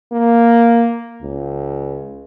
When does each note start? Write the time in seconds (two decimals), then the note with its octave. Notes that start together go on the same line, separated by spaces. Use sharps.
0.12 A#3
1.22 C#2